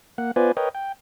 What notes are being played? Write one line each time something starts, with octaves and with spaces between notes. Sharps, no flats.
A#3 F#5
B3 F4 B4 C5 D5 G#5
A#4 B4 C#5 D#5 G5
G5